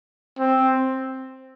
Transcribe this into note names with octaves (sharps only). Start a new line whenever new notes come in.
C4